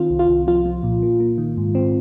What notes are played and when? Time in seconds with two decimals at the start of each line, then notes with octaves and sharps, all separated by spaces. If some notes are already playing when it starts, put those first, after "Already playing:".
Already playing: D#3 C4 F4
0.10 C2
0.19 F4
0.28 C2
0.47 F3 F4
0.66 F3
0.83 A#2
1.02 A#3
1.20 A#3
1.38 D#3
1.57 G#2
1.75 C4